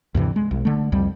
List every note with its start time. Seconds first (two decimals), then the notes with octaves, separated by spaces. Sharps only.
0.15 D2 G2 C3 E3
0.36 G#3
0.51 B1
0.65 D3 A3
0.92 C2 F2 G3